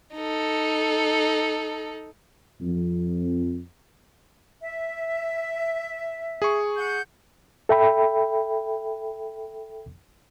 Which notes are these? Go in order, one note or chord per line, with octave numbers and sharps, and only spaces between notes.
D#4 A4
F2
E5
G#4 C#6
F#5 G6
A4 E5 G5 B5